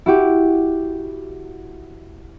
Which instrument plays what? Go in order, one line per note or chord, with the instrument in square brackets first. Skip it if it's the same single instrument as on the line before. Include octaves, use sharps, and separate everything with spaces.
[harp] E4 F#4 G4